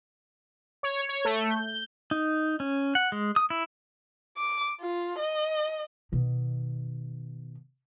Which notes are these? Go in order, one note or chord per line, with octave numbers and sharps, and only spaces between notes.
C#5
C#5
A3
G6
D#4
C#4
F#5
G#3
D#6
E4
D6
F4
D#5
B2 D#3